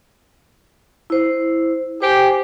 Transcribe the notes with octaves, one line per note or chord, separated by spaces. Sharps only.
E4 C5
G4 C5 G#5